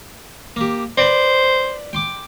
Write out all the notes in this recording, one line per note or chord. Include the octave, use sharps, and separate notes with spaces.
A#3 G4
B4 C5 D5
G5 C6 D6